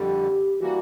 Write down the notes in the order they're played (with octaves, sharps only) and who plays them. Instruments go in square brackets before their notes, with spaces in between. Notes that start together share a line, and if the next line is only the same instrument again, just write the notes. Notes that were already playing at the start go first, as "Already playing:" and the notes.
Already playing: [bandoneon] F2 D3 G3 [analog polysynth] G4
[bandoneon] E3 G3 A#3 [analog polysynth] F#4